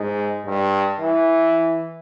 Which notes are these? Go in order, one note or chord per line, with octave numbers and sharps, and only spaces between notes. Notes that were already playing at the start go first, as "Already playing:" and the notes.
Already playing: G#2
G2
E3